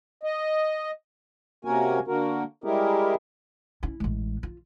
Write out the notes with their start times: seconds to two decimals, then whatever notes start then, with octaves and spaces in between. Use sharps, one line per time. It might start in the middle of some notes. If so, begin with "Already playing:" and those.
0.23 D#5
1.65 C3 A#3 C#4 F#4 A#4 G#5
2.07 D3 A#3 F#4 A#4
2.64 G3 G#3 E4 G4 G#4 A#4
3.83 C#4 E4
4.00 A1 G#3
4.43 F4